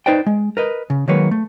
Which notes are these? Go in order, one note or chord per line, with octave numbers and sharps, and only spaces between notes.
D#4 B4 C5 D5 G5
G#3
A#4 B4 D#5
C#3
D#3 F#3 G#3 A#3 B4 C#5
A3